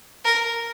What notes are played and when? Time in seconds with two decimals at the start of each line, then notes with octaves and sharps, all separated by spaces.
0.25 A#4